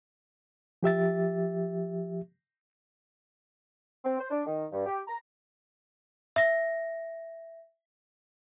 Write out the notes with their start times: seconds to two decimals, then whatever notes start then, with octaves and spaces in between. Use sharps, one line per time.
0.83 F3 G4 E5 A6
4.04 C4
4.19 C5
4.30 D4
4.46 D#3
4.72 G2
4.86 G4
5.07 A#5
6.36 E5 A#6